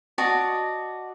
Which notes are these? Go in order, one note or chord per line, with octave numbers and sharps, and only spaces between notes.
F#4 D5 D#5 A5